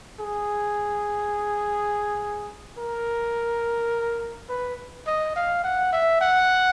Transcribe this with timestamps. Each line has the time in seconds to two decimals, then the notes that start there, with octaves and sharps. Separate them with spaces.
0.20 G#4
2.78 A#4
4.49 B4
5.07 D#5
5.36 F5
5.64 F#5
5.93 E5
6.21 F#5